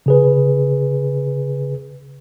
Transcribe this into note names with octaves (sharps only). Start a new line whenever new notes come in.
C#3 G#4 B4